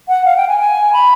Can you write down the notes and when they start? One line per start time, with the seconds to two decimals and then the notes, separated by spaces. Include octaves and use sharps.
0.09 F#5
0.25 F5
0.36 G5
0.48 G#5
0.60 G#5
0.93 B5